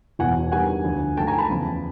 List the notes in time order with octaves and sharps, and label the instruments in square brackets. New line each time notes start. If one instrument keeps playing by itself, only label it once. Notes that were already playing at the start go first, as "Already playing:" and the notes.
[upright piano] E1 E2 B2 F#5 G#5
G2 D#3 G3 B3 F#5 G#5
D2 D3 F3
G#2 F3 A3 G5 A5
G#5 A#5
A5 B5
E2 C#3 F3